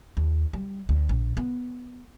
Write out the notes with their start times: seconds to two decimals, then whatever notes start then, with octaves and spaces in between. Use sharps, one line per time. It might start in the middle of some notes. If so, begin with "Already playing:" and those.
0.17 D#2
0.53 G3
0.89 D2
1.09 A#1
1.37 B3